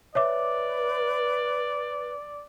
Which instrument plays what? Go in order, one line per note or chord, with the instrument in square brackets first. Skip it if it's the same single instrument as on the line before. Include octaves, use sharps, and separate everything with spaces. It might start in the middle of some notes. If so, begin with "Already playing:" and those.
[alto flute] B4 [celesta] C#5 E5 D6 [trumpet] D5